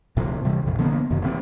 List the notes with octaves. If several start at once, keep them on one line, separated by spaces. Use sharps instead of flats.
D2 A2 C3 F3
C3 E3 G3
A#1 F2
D3 F3 A#3 B3
F#2 C3 D#3
A1 C4